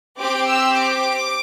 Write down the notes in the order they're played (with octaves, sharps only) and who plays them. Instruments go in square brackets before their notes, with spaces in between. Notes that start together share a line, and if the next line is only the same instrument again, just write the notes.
[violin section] C4 G4 D6
E6
D6